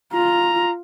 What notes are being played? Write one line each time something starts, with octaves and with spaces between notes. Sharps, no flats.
F4 A#5